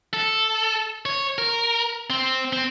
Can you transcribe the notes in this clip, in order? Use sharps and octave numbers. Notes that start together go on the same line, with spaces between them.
A4
C#5
A#4
C4
C4